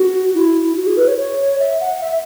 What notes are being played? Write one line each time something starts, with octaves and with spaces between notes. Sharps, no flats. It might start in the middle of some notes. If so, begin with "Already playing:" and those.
Already playing: F#4
E4
F#4
G#4
B4
C#5
C#5
E5
F#5
E5